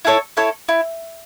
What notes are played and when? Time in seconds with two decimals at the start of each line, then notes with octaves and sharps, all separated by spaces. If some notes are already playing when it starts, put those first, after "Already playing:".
0.05 E4 A4 C#5
0.37 E4 A4 C#5
0.69 E4